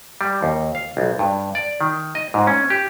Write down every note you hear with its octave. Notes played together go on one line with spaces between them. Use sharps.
G3
D#2
F5
B1
G2
D5
D#3
D#5
G#2
C#4
G4